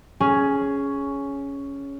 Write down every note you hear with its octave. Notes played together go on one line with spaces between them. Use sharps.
C#4 G#4